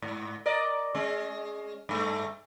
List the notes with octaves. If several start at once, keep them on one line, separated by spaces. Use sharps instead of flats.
G#2
A#4 D5 D#5
G#3 C#4
G2 A3